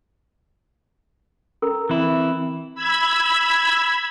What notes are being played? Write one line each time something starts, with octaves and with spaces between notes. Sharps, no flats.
C#4 A4 A#4 A#5
E3 C4 E4
B5 E6 G#6